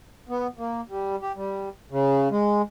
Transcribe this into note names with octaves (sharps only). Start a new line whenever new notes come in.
B3
A#3
G3
G4
G3
C#3
G#3